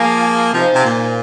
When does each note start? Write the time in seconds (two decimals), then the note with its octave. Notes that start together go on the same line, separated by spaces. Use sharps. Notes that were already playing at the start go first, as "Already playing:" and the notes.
Already playing: F3 A#3 F4 G#4 F5 G#5
0.52 C3 F3 D#4 C5 F5 G#5
0.74 C3
0.83 A#2